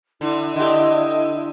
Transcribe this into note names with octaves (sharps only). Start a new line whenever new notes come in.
D3 E4
D3 G4 D#5